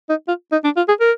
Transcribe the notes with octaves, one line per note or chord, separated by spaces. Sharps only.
D#4
F4
D#4
D4
F4
G#4
A#4